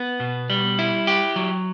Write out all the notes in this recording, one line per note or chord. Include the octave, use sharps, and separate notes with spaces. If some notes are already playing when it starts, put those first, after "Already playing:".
Already playing: B3
B2
G3
E4
G4
F#3